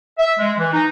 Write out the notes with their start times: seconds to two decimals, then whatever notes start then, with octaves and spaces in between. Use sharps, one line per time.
0.18 E5
0.39 G#3
0.59 E3
0.73 D#4